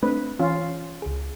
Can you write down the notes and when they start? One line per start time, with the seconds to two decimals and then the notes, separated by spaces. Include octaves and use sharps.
0.03 A3 C4 D4 B4
0.39 E3 C#4 F4
1.02 C#2 G#4